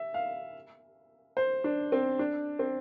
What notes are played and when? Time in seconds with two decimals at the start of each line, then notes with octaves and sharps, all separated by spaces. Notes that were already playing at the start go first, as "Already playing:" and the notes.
Already playing: E5
0.14 F5
1.37 C5
1.64 D4
1.92 C4
2.19 D4
2.59 C4